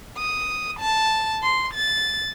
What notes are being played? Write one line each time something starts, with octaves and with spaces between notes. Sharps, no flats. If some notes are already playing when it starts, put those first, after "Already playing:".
D#6
A5
C6
A6